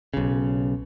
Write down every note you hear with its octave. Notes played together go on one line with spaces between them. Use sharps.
B1 C#3